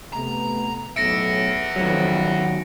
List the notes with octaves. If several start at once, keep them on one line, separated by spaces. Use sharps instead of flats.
C3 A3 B3 A#5
B1 A2 B3 E5 A#6 C#7 D7
A1 F2 D#3 F#3